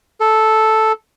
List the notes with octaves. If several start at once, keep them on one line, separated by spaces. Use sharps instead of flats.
A4